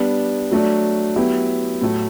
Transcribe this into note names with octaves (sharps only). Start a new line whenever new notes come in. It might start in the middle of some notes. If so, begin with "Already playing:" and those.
Already playing: G3 B3 D4
F#3 A3 D4
F#3 B3 E4 G4
A2 F#3 A3